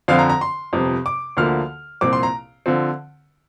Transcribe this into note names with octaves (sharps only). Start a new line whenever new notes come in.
F2 D3 F3 C4 F5
A#5
A#5
C6
G1 F2 C3
D6
D2 D3 F3 A#3 F6
C2 A#2 F3 C4 D6
C6
A#5
D3 F3 C4